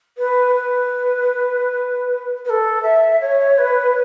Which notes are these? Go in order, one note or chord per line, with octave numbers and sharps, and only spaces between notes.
B4
B4
B4
A4
E5
C#5
B4